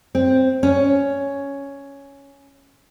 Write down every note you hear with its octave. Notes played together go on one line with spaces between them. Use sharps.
C4
C#4